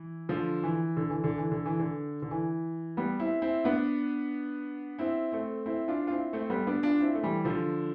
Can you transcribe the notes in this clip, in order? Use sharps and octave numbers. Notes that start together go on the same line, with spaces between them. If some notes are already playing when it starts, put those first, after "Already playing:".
Already playing: E3
D3 F3
E3
D3
E3
D3
E3
D3
E3
D3
D3
E3
G3 B3
C4 E4
C4 E4
B3 D4
C4 E4
A3 C4
C4 E4
D4 F4
F4
C4 E4
A3 C4
G3 B3
B3 D4
D4 F4
C4 E4
A3
E3 G3
D3 F3